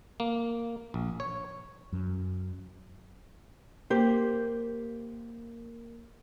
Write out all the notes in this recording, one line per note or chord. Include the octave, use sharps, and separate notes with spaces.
A#3
A#1
C#5
F#2
A#3 G4 C5